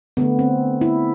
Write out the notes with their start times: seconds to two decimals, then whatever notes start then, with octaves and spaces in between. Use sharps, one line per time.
0.17 D3 A3 B3
0.39 C4
0.81 E4